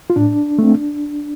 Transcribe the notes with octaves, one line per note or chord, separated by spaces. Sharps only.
F4
A2 D4
A3 C4